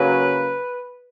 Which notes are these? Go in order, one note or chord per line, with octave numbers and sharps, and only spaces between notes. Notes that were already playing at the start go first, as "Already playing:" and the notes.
Already playing: C#3 F#3 A#3 B4